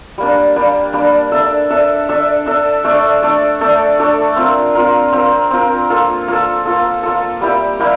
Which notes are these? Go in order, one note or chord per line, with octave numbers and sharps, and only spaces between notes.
G3 A#3 D4
G3 A#3 D4
G3 A#3 D4
D4 A4 E5
D4 A4 E5
D4 A4 E5
D4 A4 E5
A3 D4 A4 D5
A3 D4 A4 D5
A3 D4 A4 D5
A3 D4 A4 D5
C4 F4 A#4
C4 F4 A#4
C4 F4 A#4
C4 F4 A#4
A#3 F4 A4
A#3 F4 A4
A#3 F4 A4
A#3 F4 A4
G3 A#3 E4 G4
G3 A#3 E4 G4